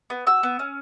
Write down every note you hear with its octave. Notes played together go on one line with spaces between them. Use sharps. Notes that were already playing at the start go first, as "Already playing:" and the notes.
B3
F#4 E6
B3
C#4